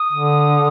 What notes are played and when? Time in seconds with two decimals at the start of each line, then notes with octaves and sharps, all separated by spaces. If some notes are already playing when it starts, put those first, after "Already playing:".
Already playing: D#6
0.13 D3